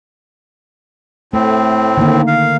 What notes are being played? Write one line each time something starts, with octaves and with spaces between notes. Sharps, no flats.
A2 A3 C4
D3 D#3 A#3
F5